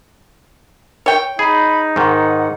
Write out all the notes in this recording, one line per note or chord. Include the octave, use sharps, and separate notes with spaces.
C#5 G5
D#4 G#4 B5
G#2 D#3 F#5